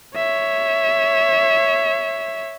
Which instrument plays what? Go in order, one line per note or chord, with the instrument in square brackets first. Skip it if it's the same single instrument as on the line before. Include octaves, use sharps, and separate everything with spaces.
[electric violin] C#5 E5